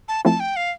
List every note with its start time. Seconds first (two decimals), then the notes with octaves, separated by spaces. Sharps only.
0.08 A5
0.25 F3 A3 C4 E4 A5
0.40 G5
0.56 F5